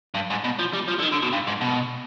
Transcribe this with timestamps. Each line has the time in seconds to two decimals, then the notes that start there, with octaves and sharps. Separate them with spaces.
0.14 G2
0.30 G#2
0.44 B2
0.59 F3
0.73 G3
0.88 F3
0.99 D3
1.02 D#3
1.12 D3
1.22 B2
1.32 G2
1.47 G#2
1.61 B2